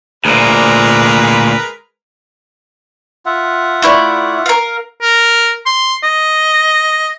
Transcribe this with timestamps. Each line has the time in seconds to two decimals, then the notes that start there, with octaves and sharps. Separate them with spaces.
0.25 D2 A#2 G#3 A#4 B4
3.26 F4 E5 F#5
3.82 A3 E4 D5
4.46 A#4 F5
5.02 A#4
5.66 C6
6.03 D#5